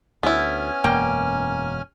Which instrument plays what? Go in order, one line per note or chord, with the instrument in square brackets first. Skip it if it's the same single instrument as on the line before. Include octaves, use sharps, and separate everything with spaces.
[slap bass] D2 [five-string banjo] B3 E4 [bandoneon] C#4 G#5 F6
[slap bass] E1 F#2 [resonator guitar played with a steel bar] A#3 G5